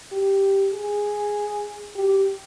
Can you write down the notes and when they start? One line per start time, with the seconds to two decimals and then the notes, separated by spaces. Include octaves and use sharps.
0.12 G4
0.73 G#4
1.96 G4